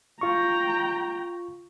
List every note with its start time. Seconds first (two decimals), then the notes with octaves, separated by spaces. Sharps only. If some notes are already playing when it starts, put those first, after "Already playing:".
0.21 F4 G5 A#5 C#6